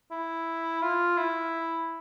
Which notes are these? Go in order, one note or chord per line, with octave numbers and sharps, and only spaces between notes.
E4
F4
E4